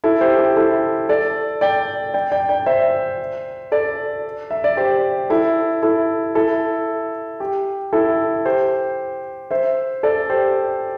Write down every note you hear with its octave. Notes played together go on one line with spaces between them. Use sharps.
E4 A4
G4 C5
G4
E4 A4
A4 D5
D5 G5
D5 G5
D5 G5
D5 G5
C5 E5
A4 D5
E5
D5
G4 C5
E4 A4
E4 A4
E4 A4
G4
E4 A4
G4 C5
C5 E5
A4 D5
G4 C5